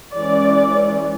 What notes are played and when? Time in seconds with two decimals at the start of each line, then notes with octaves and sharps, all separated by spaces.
0.15 E3 G#3 C#4 D5